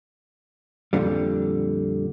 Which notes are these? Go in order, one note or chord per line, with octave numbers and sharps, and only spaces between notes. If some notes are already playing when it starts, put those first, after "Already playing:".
F2 A#2 D3 G3